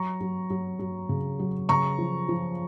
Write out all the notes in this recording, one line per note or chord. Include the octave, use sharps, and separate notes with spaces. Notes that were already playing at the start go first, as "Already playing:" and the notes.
Already playing: F#3 A#5 C#6
F#3
F#3
F#3
C#3
F#3
C#3 A#5 C#6
F3
F3